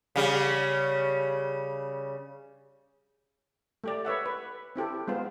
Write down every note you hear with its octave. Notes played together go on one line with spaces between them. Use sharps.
C#3 G3
A3 G4 D5
B4 C#5 E5 F#5
B4
C4 E4 G4 A4
G#3 B3 F4 C5